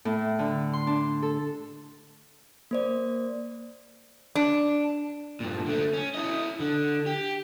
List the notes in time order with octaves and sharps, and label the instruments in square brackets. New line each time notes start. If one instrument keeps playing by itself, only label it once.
[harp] A2
D3
C6
D4
A4
[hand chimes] A#3 C5 D5
[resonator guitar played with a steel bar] D4
[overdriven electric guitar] G2 A#2
D3 A3
C#4
E4 D#5
D3
G4